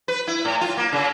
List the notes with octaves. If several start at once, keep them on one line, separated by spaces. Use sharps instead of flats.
B4
E4
A2
F4
A#3
C#3